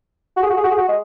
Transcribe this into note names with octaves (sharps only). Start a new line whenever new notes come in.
F#4
G#4
F#4
G#4
F#4
G#4
F#4
G#3